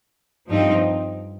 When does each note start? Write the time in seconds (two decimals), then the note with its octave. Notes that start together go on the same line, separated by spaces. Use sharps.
0.49 G2 F3 C4 D#4